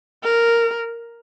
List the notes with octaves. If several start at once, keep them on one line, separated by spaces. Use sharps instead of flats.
A#4